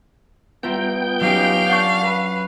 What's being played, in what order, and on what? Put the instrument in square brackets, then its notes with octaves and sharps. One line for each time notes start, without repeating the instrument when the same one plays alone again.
[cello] G3 [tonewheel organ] B3 G5 G6 [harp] F4 E5 A#5
[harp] F#3 C#4 [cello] D#4 G4 [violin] F5
[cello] D4 [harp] F#5 C#6
[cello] B4